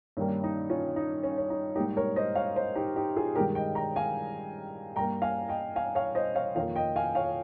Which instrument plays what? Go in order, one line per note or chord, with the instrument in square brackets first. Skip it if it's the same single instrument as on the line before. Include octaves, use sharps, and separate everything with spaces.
[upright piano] G2 D#3 G3 A#3 C#4
D#4
C#4 F4
D#4
C#4
C#4
D#4
G#2 G3 A#3 D#4 G4
A#4 C#5
C5 D#5
C#5 F5
C5 D#5
D#4 G4
D#4 G4
F4 G#4
G2 D#3 G#3 G4 A#4
D#5 G5
G5 A#5
F5 G#5
G2 G3 A#3 G5 A#5
F5 G#5
D#5 G5
F5 G#5
C#5 F5
C5 D#5
C#5 F5
F2 D#3 A#3 C#5 F5
D#5 G5
F5 G#5
C#5 F5